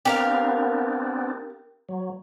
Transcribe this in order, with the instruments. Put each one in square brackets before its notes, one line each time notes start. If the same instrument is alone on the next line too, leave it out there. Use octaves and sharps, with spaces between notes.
[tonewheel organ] B3 C4 D4 [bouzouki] G4 A#4 F5
[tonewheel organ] F#3